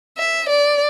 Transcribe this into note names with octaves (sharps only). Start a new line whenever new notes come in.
E5
D5